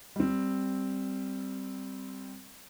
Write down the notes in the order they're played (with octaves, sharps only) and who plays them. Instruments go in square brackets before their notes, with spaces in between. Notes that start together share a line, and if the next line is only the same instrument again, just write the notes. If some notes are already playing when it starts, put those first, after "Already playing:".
[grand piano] G3 C4